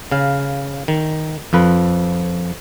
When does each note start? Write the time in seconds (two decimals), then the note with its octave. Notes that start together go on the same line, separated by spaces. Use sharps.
0.12 C#3 F5
0.88 D#3
1.53 F2 F3 B4